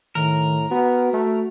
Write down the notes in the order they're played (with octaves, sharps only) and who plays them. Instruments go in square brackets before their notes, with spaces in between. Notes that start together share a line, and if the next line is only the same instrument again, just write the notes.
[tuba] A2 [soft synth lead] D#3 [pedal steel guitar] A#4
[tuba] B3 [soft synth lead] F#4
[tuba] A3